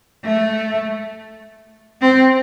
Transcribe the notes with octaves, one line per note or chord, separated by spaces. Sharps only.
A3
C4